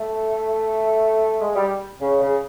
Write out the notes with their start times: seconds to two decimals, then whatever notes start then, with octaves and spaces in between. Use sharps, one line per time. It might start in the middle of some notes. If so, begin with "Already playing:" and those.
Already playing: A3
1.40 G#3
1.55 G3
2.01 C#3
2.21 C#3